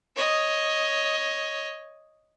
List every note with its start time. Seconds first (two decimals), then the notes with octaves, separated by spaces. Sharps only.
0.16 C#5 D#5